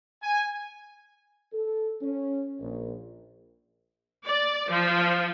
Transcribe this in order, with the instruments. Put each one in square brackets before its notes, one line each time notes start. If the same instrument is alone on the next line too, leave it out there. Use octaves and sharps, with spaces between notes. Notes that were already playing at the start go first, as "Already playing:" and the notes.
[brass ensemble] G#5
A4
C#4
A#1
[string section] D5
F3